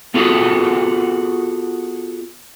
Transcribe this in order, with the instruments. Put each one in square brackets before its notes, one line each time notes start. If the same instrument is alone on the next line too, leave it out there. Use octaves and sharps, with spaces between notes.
[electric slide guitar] B3 F4 F#4 G#4 A4